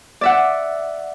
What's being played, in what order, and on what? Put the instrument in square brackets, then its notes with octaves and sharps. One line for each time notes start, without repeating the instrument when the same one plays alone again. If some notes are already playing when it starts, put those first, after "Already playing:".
[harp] D5 E5 F#5